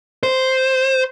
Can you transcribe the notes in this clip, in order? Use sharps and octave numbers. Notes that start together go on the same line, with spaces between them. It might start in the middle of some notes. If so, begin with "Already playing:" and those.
C5